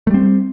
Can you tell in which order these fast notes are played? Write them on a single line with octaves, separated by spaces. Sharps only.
A3 G3 C4